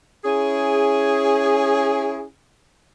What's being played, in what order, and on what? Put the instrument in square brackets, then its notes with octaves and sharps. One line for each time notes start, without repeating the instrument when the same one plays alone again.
[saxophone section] C#4 E4 G#4